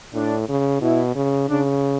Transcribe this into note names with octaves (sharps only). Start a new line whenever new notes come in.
A2 D4
C#3
B2 E4
C#3
C#3 D4